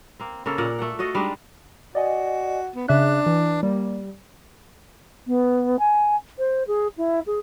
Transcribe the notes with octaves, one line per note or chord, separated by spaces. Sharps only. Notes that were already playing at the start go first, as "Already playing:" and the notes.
A#3 C4
C#3 A#3 C#4 A4
A#2 A#4 D5 F#5
A3 A4 F#5
F#4 A4 D#5 F5
G3 G#3 D4 D#4
F#4 D5 D#5 G#5
B3
C#3 D4 E5 F#6
E3
G3 A#3
B3
G#5
C5
G#4
E4
G#4